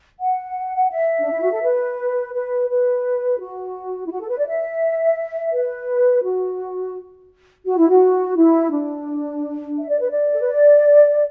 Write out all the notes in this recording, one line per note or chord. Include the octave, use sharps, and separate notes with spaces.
F#5
E5
D4
E4
F#4
A4
B4
B4
B4
F#4
E4
F#4
A4
B4
D5
E5
B4
F#4
F#4
E4
F#4
E4
D4
E5
D5
B4
D5
A4
B4
D5